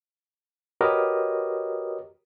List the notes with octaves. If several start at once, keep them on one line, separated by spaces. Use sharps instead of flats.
F#4 G4 A#4 B4 C#5 D#5